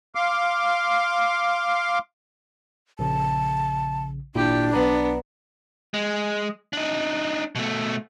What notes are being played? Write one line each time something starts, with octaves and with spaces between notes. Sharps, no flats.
F5 C6 D6
A#1 C#3 A5
G#1 A#2 D4 E4 G4
B1 B3 D5 A#5
G#3
D4 D#4
B2 A3